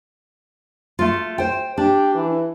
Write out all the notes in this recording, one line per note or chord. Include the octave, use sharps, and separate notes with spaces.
A3 F4
C5 G5
D4 G4
E3